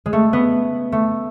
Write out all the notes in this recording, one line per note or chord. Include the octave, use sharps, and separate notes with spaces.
G#3
A3
B3
A3